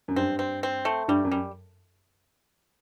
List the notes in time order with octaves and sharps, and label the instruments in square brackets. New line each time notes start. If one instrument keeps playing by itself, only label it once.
[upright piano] F#2
[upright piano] G2 [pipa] C4
[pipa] C4
C4
A3
[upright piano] G2 [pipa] G3
[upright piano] F#2
[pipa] G3